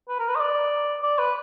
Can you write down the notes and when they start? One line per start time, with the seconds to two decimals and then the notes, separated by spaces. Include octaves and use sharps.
0.09 B4
0.19 A#4
0.28 B4
0.35 D#5
0.40 D5
1.03 D5
1.19 B4